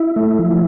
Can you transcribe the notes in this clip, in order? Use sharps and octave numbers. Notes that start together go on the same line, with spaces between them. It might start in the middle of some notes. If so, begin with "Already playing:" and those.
Already playing: E4
A3
F3